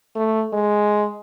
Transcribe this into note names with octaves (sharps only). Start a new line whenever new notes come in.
A3
G#3